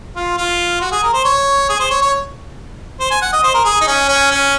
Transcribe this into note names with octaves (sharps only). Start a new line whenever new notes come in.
F4
F4
F#4
G#4
A#4
C5
C#5
G#4
C5
C#5
C#5
C5
G#5
F#5
D#5
C5
A#4
G#4
D#4
C#4
C#4
C#4